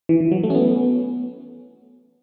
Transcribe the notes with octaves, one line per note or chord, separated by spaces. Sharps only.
E3
E3
F#3
A3
C#4
B3